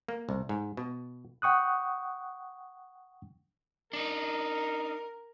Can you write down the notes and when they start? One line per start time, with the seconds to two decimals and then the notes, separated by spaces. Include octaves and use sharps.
0.08 A#3
0.29 C2
0.49 G#2
0.77 B2
1.42 F#5 G5 C#6 D#6 F#6
3.93 D4 D#4 A#4